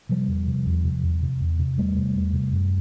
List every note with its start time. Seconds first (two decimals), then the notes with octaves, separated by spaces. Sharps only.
0.09 C3 F3 G3
0.28 E2
0.47 C3
0.66 E2
0.84 C3
1.03 E2
1.22 C3
1.40 E2
1.59 C3
1.78 E2 G3 A3
1.97 C3
2.15 E2
2.33 C3
2.53 F#2